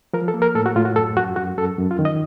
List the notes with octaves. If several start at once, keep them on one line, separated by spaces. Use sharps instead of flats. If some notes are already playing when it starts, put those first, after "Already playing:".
F3 A#4
A4
A#3
A#4
A2 A4
F#4
A2 F4
F#4
F#2 A4
F#2 F#4
F#2 F#4
F#2 A4
F#2
F4
D#3
D#5